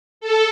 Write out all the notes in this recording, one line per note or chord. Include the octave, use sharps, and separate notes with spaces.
A4